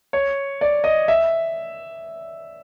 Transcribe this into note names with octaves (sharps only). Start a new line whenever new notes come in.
C#5
D5
D#5
E5